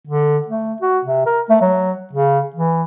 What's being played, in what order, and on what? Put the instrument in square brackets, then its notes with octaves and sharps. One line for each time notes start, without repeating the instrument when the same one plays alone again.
[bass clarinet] D3
A3
F#4
C3
A#4
A3
F#3
C#3
E3